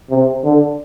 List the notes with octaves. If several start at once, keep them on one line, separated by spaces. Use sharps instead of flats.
C3
D3